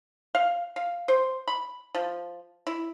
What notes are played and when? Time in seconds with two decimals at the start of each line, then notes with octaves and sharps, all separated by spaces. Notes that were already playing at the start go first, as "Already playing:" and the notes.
0.35 F5
0.76 F5
1.08 C5
1.48 B5
1.95 F3
2.67 E4